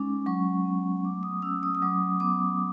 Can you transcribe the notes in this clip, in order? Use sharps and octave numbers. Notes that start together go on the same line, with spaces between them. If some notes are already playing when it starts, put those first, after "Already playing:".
Already playing: G#3 C#4 D#4 D6
F#3 C#6
B3
A3 D6
D#6
C#4 E6
D#6
D#6
F#3 D6
B3 D6